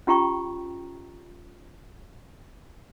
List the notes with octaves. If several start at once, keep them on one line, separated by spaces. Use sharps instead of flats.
C#4 F4 G4 G5 A#5 C#6